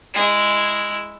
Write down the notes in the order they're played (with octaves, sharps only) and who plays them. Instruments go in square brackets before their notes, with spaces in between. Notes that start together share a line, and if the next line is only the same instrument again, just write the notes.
[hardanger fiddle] G#3 E4